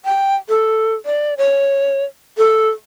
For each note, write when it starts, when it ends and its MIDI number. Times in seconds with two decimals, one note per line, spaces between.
0.05 0.36 79
0.49 0.94 69
1.06 1.34 74
1.38 2.04 73
2.38 2.68 69